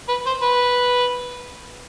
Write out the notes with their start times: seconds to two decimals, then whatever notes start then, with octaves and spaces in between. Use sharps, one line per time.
0.09 B4
0.26 C5
0.42 B4